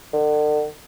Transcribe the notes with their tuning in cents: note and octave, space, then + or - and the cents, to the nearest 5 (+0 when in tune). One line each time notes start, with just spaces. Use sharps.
D3 +40